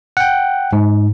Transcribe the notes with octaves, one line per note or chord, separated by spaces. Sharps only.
F#5 G5
G#2